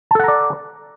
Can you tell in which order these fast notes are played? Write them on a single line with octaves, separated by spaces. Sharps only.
A5 A4 F#5 A#5 D5